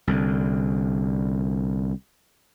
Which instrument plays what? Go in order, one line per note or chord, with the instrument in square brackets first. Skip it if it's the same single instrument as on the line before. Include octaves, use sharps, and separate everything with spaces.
[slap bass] C2 D3